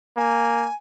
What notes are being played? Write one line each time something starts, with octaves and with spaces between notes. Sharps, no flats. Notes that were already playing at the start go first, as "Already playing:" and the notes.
A#3 G#5